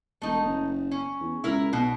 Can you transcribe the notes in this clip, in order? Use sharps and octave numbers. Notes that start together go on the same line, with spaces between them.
E1 A3 D#4
F#1
C#4
E2
C#2 E4 A#4
B1 B2